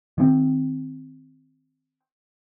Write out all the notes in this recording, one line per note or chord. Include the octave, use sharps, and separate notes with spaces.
D#3 C4